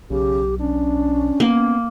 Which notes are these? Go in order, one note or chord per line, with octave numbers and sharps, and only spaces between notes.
B1 C#3 G4
C#4 D4
A#3 B3